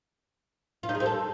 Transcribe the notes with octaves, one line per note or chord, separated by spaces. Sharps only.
F4
D#4
G#4
C4
A4